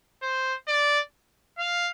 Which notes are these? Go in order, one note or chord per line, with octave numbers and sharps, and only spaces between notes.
C5
D5
F5